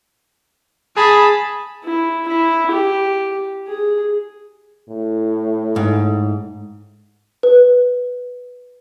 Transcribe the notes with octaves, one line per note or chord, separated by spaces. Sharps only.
G#4 A5 B5
E4
E4
G4
G#4
A2
G#2
B4